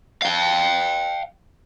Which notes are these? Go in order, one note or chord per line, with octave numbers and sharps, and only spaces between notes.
F5 G5